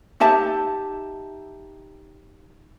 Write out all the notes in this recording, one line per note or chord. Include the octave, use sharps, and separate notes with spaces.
D#4 G4 E5 A5